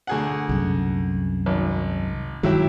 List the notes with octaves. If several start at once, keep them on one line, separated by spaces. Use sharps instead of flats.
D2 G#4 F#5
C2 F#2
G#1
G2 D#3 F#3 G#3 E4 G4